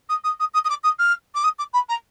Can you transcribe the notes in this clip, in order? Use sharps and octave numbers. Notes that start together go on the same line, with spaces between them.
D#6
D#6
D#6
D#6
D#6
D6
D#6
F6
D6
D#6
D6
B5
A#5